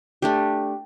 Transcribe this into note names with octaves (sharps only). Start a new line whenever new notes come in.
A3 D4 G4